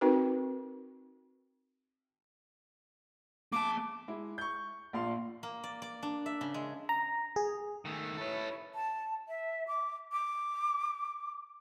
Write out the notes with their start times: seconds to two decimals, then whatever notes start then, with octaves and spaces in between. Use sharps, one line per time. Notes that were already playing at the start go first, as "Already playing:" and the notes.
0.01 C4 D#4 F#4 A#4 B4
3.52 A#3 A5 D6
4.08 G#3 E4
4.38 C#6 G6
4.93 A#1 A#2 F5 C6
5.43 A#3
5.64 D5
5.82 D5
6.03 D4
6.26 E5
6.41 C#3
6.54 G#3
6.89 A#5
7.36 G#4
7.85 D#3 A3
8.17 E4 A4 B4 C#5
8.75 A5
9.28 E5
9.67 D6
10.12 D6